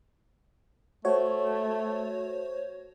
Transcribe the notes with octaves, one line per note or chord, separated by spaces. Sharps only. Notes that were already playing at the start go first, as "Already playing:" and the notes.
A3 F#4 C5 C#5